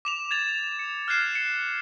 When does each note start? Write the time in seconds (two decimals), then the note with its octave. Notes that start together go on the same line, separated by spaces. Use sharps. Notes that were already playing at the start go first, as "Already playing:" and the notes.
0.05 D6 E7 F7
0.31 G#6 A6 F7
0.79 C#7
1.08 F6 F#6 G#6 C7 E7
1.35 C#7